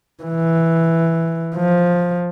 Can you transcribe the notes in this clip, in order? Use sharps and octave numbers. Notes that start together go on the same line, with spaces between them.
E3
F3